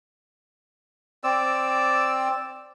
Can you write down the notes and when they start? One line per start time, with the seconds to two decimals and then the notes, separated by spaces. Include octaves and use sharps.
1.24 C4 D5 E6